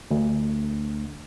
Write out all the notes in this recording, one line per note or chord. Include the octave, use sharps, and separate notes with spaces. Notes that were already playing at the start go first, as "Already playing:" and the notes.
D2